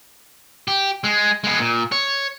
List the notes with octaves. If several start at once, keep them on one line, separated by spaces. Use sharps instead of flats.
G4
G#3
G#3 B3
A#2
C#5